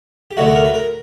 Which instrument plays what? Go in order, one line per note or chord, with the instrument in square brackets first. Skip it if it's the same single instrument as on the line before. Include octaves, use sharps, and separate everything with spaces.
[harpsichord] G4
D2 D3 F#3 A3 D4 F#4
A4
A#4
B4
A#4